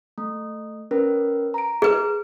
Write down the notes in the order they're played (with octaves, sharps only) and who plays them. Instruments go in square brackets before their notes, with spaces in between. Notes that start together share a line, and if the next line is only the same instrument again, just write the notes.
[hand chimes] A3
C#4 A#4 B4
A#5 D7
[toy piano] G#4 B4